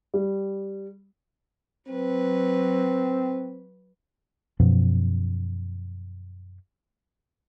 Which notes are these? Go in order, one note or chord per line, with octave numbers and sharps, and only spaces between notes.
G3
F#3 C4 B4
F#2 B2 F3